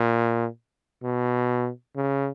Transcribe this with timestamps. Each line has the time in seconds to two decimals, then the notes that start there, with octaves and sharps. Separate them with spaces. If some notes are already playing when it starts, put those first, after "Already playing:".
Already playing: A#2
1.03 B2
1.96 C#3